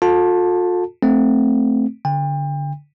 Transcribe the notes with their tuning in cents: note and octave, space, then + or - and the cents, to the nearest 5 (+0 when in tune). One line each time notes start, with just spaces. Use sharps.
F4 +45 A4 +5 A5 +0
A3 +0 C4 +0
D3 -20 G5 +35